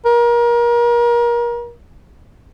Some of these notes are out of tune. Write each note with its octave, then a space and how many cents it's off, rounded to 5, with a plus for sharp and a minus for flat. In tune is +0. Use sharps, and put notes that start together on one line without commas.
A#4 +30